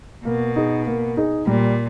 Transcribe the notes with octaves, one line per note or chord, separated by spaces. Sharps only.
B2 A#3
D#4 G#4
A#3
D#4 G#4
A#2 G3